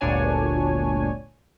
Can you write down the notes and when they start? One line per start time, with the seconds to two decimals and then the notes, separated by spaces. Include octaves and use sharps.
0.01 G1 D2 A#2 D4 C#5 G#5